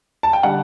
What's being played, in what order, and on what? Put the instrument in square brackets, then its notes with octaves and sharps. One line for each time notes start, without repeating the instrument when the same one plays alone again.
[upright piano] A5
G5
D3 G3 F#5